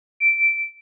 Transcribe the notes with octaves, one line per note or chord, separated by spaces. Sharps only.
D7